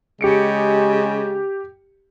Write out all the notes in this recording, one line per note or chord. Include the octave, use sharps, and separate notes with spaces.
C#3 G#3 G4 C#7 D7